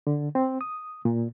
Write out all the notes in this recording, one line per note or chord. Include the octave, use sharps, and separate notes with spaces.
D3
C4
D#6
A#2